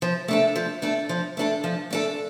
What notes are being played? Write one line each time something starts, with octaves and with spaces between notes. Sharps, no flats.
F3
A3 D4 A4
F3
A3 D4 A4
F3
A3 D4 A4
F3
A3 D4 A4